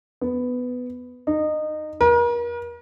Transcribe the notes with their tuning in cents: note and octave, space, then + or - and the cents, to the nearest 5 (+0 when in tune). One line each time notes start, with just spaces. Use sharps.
B3 +10
D#4 -20
A#4 +40